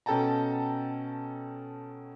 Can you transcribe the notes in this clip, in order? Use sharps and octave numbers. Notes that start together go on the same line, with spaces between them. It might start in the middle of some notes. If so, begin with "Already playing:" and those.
B2 C#4 A4 G5 A5 A#5